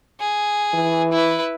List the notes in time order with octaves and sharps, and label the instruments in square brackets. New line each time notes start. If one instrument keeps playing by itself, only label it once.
[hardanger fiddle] G#4
[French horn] E3
[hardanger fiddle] E4 B4